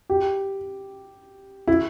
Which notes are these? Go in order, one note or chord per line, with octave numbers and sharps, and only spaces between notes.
G4
E4